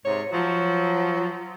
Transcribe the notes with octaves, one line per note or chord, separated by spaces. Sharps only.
G#2 C3 C#5
F3 F#3 F#4